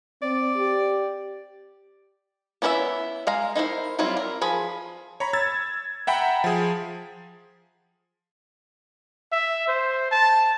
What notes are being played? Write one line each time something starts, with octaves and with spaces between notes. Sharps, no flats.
C4 D5
G4
B3 C#4 E4 A#4 E5
G#3 F5 A#5
D#4 E4 A#4 C5
F#3 G3 C4 E4 F4
A#4
F3 G#4 B5
C#5 A#5 B5
E6 G#6 A6
E5 F#5 G5 A#5 B5
F3 G#4
E5
C5
A5